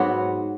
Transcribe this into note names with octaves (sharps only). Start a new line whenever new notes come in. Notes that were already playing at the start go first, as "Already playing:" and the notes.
Already playing: G#2 F#3 B3